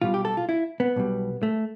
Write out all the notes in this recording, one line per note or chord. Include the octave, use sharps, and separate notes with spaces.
B1 B2 G3 F4
G4
A4
F4
E4
B3
B1 B2 G3
A3